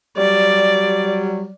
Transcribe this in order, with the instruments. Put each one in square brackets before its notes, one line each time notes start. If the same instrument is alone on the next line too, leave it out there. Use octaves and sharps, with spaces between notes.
[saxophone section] F#3 G3 [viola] D5